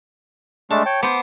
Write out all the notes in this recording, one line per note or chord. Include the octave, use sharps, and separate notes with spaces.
G#3 A3 D4 A5
C#5 G5
B3 C5 D6